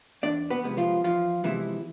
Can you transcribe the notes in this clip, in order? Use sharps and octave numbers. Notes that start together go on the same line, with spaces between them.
E2 D4 D5
B3 B4
C3 F3 G#3 B3
F3 F4
E2 F3 F4
C3 E3 F3 G#3 B3 E4